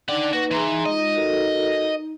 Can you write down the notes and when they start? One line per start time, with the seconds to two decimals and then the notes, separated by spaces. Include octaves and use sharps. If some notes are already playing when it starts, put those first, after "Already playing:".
0.09 D4 D#4 D5 F#5 G5 D6
0.33 A#3 F#4 B4
0.51 E3 G#4 A#5 C6
0.86 G#3 F4 D#5
1.15 F#4 A4 A#4